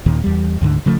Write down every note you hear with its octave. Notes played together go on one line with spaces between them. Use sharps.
D#2 A#2 D#3
E2 G3
D2 G#2 D3
C#3 F3 A3